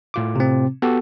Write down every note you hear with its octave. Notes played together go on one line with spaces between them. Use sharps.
A2 F4 D6
C3 C4
B3 F#4 G4 A4